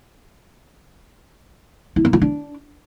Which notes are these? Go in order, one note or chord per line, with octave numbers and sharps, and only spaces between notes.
E4
A#3
F4
D4